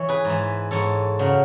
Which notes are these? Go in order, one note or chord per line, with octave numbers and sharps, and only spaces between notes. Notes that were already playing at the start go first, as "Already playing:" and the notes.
Already playing: E3 C#5
G#4 B4
G#2 E3
G#2 E3 A4 C#5
F#2 C#3 F#3